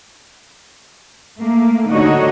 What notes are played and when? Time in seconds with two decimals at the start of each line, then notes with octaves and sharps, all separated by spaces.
1.40 A3 A#3
1.91 D3 D#4 F#4 C#5 D#5